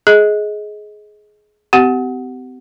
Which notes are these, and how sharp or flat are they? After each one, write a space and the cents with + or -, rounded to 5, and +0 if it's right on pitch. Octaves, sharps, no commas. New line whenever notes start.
G#4 +20 D#5 +20
C4 -45 G4 -30 F#5 +0